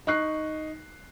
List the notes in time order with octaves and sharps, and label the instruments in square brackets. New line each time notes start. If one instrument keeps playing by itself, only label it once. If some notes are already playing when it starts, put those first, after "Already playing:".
[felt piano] D#4 C#6 F#6 C7